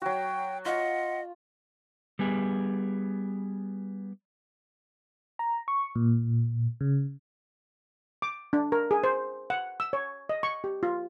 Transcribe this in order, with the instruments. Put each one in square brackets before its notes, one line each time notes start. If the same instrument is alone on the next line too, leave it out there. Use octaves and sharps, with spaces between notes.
[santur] F#3 F#4 [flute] G5
[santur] F4 [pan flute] D#5 [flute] F#5
[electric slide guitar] G3 B3 G#4
[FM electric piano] A#5
C#6
A#2
C#3
[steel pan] D6
D4
A#4
G#4
C5
F#5
E6
C#5
D#5
C#6
G4
F4